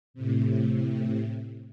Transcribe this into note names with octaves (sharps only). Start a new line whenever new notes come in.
A2 C3